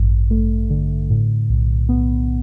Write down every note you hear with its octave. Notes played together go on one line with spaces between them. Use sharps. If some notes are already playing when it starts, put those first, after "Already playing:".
Already playing: A1 G2
A3
D3
A2
B1
B3